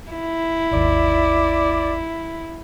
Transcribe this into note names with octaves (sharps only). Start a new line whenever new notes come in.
E4
G#1 D#2 D5